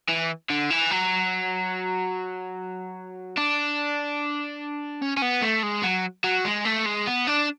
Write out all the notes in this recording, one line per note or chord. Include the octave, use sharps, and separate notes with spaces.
E3
D3
E3
F#3
D4
C#4
C#4
B3
A3
G#3
F#3
F#3
G#3
A3
G#3
B3
D4